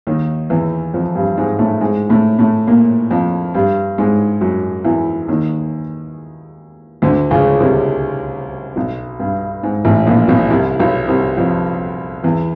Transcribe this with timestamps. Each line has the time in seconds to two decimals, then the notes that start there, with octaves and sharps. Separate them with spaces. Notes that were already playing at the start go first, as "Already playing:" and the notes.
0.07 D#2 D#3
0.50 E2 E3
0.94 F2 F3
1.15 G2 G3
1.37 G#2 G#3
1.59 A2 A3
1.81 G#2 G#3
2.09 A2 A3
2.39 A2 A3
2.67 A#2 A#3
3.11 F2 F3
3.54 G2 G3
3.98 G#2 G#3
4.41 F#2 F#3
4.85 E2 E3
5.28 D#2 D#3
7.02 D2 D3
7.31 C#2 C#3
7.60 C2 C3
8.76 B1 B2
9.20 G2
9.63 G#2
9.85 A1 A2
10.06 A#1 A#2
10.28 B1 B2
10.50 C2 C3
10.80 B1 B2
11.08 C2 C3
11.37 F2 F3
12.23 E2 E3